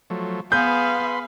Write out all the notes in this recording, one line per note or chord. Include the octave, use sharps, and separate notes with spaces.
F3 F#3 A3
B3 G#4 B4 F5 B5 C6 G6